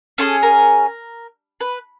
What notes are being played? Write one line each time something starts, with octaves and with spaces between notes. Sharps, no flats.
C#4 F4 G#4 A4
A#4
B4